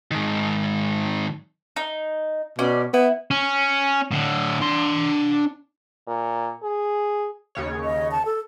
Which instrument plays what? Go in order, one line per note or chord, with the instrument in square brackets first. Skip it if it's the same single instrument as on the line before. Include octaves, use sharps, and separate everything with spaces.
[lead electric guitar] G#2 D#3
[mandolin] D#4
[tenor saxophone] B2 [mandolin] C#4 D5
[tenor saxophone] B3 [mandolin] E4
[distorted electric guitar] C#4
A2 D3
D4 C6
[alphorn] A#2
G#4
[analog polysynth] D#2 C#3 C#5
[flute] D#5
A5
A4